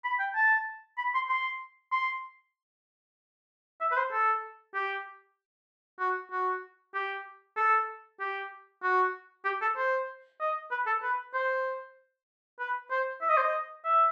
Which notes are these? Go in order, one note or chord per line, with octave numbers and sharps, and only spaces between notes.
B5
G5
A5
B5
C6
C6
C6
E5
B4
C5
A4
G4
F#4
F#4
G4
A4
G4
F#4
G4
A4
C5
D#5
B4
A4
B4
C5
B4
C5
E5
D#5
C5
D#5
E5